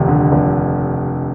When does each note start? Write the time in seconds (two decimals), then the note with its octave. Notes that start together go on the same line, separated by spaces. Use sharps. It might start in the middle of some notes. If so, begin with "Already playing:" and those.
Already playing: F1 D#2 D#5
0.08 D3
0.32 F1